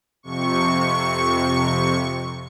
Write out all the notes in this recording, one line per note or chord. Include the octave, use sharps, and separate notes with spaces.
F2 C3 C#6